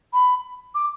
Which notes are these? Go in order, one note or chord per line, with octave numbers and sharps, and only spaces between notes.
B5
D6